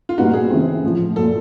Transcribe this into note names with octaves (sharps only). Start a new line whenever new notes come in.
F4
A#2 G3 B3 D#4 F#4
G#4
C#3 E3 A3 C4
A2 F3 A3
A#2 F#3 A4